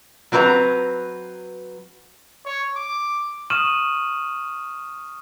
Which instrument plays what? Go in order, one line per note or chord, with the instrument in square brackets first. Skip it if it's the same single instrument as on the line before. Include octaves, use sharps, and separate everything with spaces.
[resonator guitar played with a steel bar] F#3 C4 B4 C5 A#5
[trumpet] C#5
D6
[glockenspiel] C#6 D#6 F6 D#7 E7 F#7